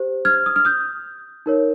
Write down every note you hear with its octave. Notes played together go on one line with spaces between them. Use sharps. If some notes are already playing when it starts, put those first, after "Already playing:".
Already playing: G4 C5
F6 G#6
D#6
F6
D#6 G6
D#4 A#4 C#5